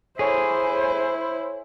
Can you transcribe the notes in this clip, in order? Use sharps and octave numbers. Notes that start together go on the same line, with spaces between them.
E4 G#4 A4 C5 C#5 G#5